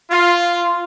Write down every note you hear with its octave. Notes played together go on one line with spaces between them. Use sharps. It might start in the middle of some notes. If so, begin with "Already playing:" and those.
F4